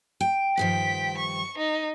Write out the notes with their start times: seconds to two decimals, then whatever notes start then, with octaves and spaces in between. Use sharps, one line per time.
0.21 G5
0.58 G2 D#3 F3 G5 B6
1.17 C#6
1.58 D#4